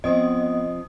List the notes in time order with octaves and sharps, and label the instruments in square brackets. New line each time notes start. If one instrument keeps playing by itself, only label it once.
[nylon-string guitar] F3 C4 [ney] B3 [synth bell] D#5 D#6